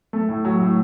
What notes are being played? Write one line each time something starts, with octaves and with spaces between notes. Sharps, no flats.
A3
A2
F#3
A2